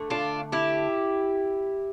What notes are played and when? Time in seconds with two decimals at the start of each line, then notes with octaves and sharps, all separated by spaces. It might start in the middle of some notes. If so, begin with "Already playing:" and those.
Already playing: D3 A3
0.10 D4 F4
0.52 E4 G4